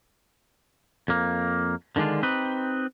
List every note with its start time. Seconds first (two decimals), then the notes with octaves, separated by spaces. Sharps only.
1.08 F2 A#3
1.96 D3 D#3 G#3 D4 F4
2.23 C4 D#4 G4 B4